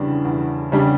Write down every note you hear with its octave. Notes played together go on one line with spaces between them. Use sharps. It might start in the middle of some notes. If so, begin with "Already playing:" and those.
Already playing: E2 C#3 G3 D4
E2
C#3 G3 D4